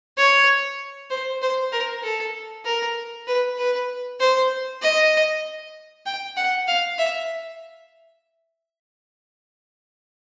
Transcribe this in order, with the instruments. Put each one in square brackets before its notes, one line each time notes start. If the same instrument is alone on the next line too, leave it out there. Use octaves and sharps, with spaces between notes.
[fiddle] C#5
C5
C5
A#4
A4
A#4
B4
B4
C5
D#5
G5
F#5
F5
E5